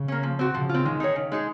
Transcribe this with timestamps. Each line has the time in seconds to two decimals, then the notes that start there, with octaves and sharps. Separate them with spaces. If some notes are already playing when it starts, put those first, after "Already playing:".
Already playing: C#3
0.08 A#3 C#4
0.23 F3
0.39 C4 F#4
0.54 C#3 F3
0.69 C4 F4
0.85 D#3 G#3
1.00 D#4 G#4 C#5
1.16 C#3
1.32 G#3 D#4 G#4